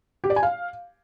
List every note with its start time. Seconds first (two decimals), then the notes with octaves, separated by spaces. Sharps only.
0.24 G4
0.30 D5
0.36 G#5
0.43 F5